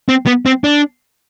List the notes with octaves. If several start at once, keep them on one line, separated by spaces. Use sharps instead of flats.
C4
B3
C4
D4